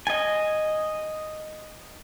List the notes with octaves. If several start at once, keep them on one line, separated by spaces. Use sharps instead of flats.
D#5 G#5